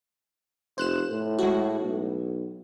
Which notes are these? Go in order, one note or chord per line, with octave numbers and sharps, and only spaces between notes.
F1 C5 F#6 E7
A2
G#3 F#4
B1